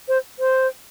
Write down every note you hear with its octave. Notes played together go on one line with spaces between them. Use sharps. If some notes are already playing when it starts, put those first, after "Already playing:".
C5
C5